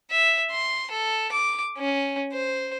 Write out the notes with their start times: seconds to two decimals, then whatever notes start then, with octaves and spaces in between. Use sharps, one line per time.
0.11 E5
0.51 C6
0.91 A4
1.32 D6
1.77 C#4
2.33 C5